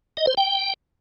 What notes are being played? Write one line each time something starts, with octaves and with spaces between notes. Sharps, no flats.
D#5
C5
G5